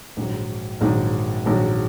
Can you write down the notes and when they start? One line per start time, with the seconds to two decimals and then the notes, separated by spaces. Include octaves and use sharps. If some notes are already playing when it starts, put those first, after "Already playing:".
0.17 A#1 G#2 D#3 F#3
0.81 A#1 G#2 D#3 F#3
1.46 A#1 G#2 D#3 F#3